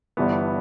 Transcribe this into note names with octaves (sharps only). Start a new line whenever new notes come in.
G1 G2 E3 B3